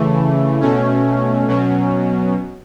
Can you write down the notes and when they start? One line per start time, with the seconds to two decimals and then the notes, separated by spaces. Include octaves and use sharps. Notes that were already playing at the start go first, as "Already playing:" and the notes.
Already playing: C#3 E3 A3
0.61 B2 A3 C#4
1.48 B2 F#3 C#4